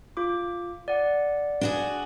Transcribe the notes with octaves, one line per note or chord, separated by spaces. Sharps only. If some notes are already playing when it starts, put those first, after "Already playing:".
F4 D6
D5 F#5
D4 F#4 G#4